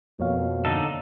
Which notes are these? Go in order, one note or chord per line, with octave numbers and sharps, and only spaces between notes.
F2 B2 A#3 C#5 F5
D3 D#4 A4